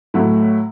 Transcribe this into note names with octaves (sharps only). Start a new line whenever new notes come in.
A2 F#3 A3 E4